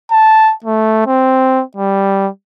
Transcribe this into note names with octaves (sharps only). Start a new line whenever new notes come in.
A5
A3
C4
G3